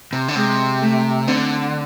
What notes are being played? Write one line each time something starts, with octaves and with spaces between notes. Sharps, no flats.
C3
D3
C3 G#3
A3
D3 C4